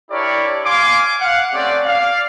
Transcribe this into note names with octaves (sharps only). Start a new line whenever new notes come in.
D4 E4 G4 A#4 C#5 D5
F5 G#5 C6 D6
F5 F#5
A3 C4 C#4 G4 D5
D5 F5